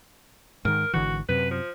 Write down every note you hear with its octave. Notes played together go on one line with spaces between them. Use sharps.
G#2 D#3 A#4
G#1 D3 E3 F#4
F#2 C3 B4
F3